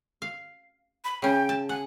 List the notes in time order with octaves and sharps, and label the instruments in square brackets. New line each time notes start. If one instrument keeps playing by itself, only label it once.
[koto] F5
[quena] B5
[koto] C#3 C#4 [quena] G5
[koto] A5
[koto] F#5 [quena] G#5